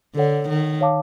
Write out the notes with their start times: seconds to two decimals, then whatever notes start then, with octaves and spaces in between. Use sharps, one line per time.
0.16 D3 A4 C#5 F#5
0.49 D#3
0.81 C#5 F5 A5 D6